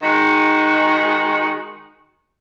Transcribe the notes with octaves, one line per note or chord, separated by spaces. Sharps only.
D#3 G#3 D#4 F#4